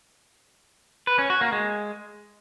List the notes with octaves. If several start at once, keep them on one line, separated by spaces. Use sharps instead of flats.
B4
C#4
F#4
A#3
G#3